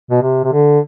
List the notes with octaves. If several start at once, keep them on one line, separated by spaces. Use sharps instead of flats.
B2
C3
C3
D3